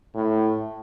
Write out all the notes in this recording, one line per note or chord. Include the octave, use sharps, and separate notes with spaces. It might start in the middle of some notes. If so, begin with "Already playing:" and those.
A2